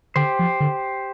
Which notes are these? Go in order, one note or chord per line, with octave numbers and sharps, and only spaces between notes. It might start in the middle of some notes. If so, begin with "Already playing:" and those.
D3 G4 C5
F3
D3